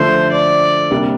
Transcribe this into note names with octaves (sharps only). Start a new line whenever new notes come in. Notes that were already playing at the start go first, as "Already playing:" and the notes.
Already playing: D3 F3 A3 C5
D5
C3 G3 A#3 D4